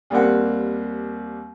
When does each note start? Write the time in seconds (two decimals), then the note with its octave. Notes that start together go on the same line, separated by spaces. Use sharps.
0.10 D#2 G3 A#3 C4 F#5